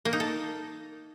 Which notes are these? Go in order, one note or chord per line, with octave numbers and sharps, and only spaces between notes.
A#3
D#4
A4